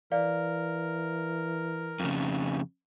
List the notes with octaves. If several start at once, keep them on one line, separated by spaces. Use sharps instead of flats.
E3 A#4 D5 F5
F2 C#3